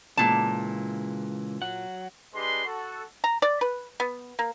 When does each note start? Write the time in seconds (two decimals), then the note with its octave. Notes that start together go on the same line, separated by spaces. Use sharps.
0.17 A#2 C#3 E3 G#3 A5
1.62 F#3 F#5
2.35 G#3 D4 G4 B4 C6
2.65 F#4 A4
3.24 A#5
3.42 D5
3.61 B4
4.00 B3
4.39 A#3